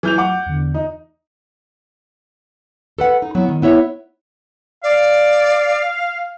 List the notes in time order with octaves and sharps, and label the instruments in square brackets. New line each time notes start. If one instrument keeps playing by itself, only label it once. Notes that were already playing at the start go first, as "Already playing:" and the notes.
[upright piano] E3 G6 F7 [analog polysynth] F#3
[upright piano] F#5 D6
[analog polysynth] E2 D3
[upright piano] D#4
[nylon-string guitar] A4 B4 F#5
D#4
F#3 B3 E4
D#3
B3 E4 C#5 E5
[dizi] D5 [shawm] F5